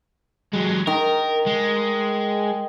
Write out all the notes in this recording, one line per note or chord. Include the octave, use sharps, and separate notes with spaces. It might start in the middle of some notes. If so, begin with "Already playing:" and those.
F#3 G#3
D#3 A#4
G#3